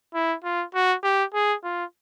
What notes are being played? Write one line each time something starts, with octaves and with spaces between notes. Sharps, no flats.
E4
F4
F#4
G4
G#4
F4